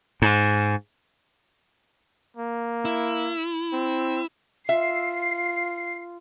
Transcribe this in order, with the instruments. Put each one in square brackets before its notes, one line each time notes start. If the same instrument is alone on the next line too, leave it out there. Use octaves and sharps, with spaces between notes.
[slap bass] G#2
[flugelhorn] A#3
[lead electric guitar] E4
[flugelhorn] C4
[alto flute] F4 [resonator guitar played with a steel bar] E5 [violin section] C7